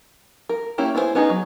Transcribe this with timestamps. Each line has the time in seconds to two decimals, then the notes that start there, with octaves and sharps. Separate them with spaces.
0.49 A#4
0.78 A#3 C#4 E4 G4
0.95 B3 E4 G#4 A4 C5
1.15 B3 C#4 D#4 G#4 A#5
1.30 F#3